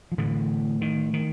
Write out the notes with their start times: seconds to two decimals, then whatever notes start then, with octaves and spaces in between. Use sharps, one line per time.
0.12 F3
0.18 A2 D3 E3
0.81 D#3
1.13 D#3